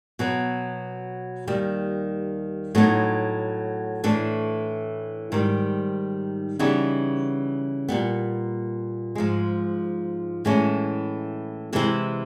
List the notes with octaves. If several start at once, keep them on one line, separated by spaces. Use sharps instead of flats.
B2 F#3 B3
D#2 D#3 G3
A2 F#3 B3 D#4
A2 E3 A3 D4
G#2 D#3 G3
C#3 E3 G3 B3 D#4
A#2 G3 B3
G#2 F3 G#3
A2 E3 G#3 C#4
C3 E3 G#3 C4 E4